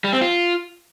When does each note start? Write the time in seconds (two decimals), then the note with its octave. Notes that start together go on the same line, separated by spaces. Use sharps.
0.04 G3
0.13 C4
0.21 F4